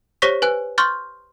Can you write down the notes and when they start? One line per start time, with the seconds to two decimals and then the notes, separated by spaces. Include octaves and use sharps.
0.22 G4 C5 C#5 C#6 A#6 B6
0.42 B4 G#5 F#6
0.78 C6 C#6 F6 G6 A6